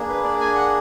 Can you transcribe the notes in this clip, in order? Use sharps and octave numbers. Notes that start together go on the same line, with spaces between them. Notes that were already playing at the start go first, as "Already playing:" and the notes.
Already playing: A#3 D4 G#4
B4
D5
G#5
F#5